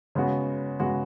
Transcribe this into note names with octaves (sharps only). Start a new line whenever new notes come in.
C#3 G#3 B3 F#4
C#3 G#3 B3 F#4